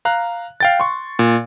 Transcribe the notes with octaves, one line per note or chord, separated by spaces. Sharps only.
F5 A#5 F#6
F5 G5 A6
C6 C#6
A#2